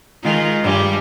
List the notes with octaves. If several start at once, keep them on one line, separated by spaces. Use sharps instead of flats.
D#3 G#3 F4
G2 G3 G#3